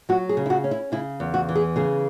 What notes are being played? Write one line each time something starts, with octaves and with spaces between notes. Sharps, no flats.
F#3 F#4
G#4
C#3
E4
F#4
C#4
E4
C#3 E4
E2
F#4
E3
G#4
C#3 G#4